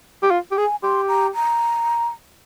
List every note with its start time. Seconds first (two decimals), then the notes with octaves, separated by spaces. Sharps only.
0.23 G4
0.31 F4
0.52 G4
0.57 G#4 G#5
0.83 G4 C6
1.09 A#5
1.35 A#5